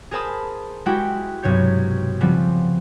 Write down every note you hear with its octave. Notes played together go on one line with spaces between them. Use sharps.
G#4 A#4 C5 A5 B5 D#6
G#3 E4 F#4 G4 G5
B1 G2 C3 C#5 G6 B6
C#3 F3 G3 B3 C4